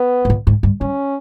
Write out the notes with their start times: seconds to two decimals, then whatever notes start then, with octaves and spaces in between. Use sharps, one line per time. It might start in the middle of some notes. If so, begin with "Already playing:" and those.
Already playing: B3
0.25 G#2
0.30 A#2
0.47 G#2
0.63 G2
0.81 G2 C#4